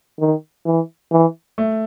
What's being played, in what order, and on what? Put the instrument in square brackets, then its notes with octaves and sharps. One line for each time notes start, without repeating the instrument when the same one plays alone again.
[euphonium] D#3
E3
E3
[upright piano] A3